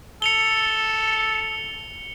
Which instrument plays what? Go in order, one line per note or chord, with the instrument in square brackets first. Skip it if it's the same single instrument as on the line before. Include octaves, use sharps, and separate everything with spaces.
[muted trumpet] A4 [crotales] C#7 F7 G7